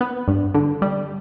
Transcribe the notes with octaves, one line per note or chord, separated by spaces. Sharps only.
B3
G2
D3
G3